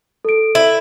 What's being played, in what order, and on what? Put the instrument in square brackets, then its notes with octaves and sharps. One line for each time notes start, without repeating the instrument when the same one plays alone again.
[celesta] A4 D7
[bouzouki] E4